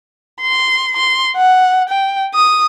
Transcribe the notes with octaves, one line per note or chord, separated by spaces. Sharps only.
C6
C6
F#5
G5
D#6